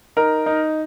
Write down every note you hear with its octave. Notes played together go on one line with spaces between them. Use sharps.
D#4 A#4
D#4